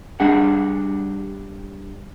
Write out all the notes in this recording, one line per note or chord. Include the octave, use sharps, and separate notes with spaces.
G3 D4 G#4 F#5